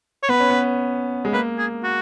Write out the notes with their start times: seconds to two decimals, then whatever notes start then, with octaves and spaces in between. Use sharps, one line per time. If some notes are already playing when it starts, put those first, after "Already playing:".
0.23 C#5
0.29 B3 B4
0.40 C#4
0.50 B3
1.25 G#3
1.33 A#3 B4
1.58 G#4
1.84 F#4